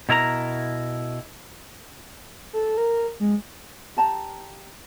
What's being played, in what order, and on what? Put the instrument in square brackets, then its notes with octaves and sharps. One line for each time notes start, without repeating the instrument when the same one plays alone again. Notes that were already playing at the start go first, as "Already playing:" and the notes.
[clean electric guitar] B2 E4 A#4 A#5
[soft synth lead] A4
A#4
G#3
[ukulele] G4 A5 A#5